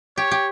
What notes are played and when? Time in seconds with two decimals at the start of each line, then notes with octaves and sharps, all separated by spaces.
0.17 G4 C#5
0.31 G4